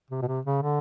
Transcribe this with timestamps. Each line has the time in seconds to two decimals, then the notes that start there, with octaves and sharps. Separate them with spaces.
0.11 C3
0.22 B2
0.28 C3
0.45 C#3
0.62 D3